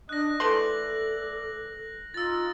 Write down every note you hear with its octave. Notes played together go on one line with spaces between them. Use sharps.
D4 D#5 F#6 A#6
E3 A3 A4 D5 C6 F#7
D#4 F4 E6 A6